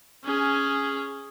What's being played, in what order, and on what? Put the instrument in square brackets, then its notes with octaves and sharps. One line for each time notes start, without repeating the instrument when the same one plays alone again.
[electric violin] C#4 G#4